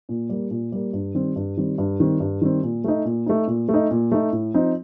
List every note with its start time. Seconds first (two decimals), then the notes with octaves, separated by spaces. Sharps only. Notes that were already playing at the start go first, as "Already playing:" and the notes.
0.09 A#2
0.29 G3 A#3
0.51 A#2
0.72 G3 A#3
0.93 G2
1.15 D#3 G3 C4
1.36 G2
1.57 D#3 G3 C4
1.78 G2
2.00 D#3 G3 C4
2.20 G2
2.42 D#3 G3 C4
2.63 A#2
2.84 A3 D#4
3.05 A#2
3.26 A3 D#4
3.47 A#2
3.69 A3
3.74 D#4
3.91 A#2
4.12 A3 D#4
4.32 A2
4.54 F3 C4 D#4